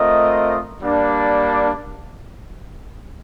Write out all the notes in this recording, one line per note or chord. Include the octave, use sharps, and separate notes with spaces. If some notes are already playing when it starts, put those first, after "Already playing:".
Already playing: A3 C4 F4 A#4 D#5
G3 A#3 D4